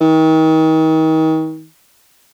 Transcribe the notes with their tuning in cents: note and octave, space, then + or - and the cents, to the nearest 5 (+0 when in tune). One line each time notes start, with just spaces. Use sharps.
D#3 +35